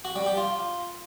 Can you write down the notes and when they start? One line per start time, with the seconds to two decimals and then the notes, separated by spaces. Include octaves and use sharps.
0.05 F#4
0.16 G3
0.26 G4
0.37 F4